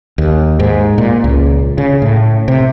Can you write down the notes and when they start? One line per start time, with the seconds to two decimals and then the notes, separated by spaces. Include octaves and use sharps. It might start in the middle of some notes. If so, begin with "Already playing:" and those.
0.18 D#2
0.60 G#2
0.98 A#2
1.24 C#2
1.78 C#3
2.02 A2
2.48 C3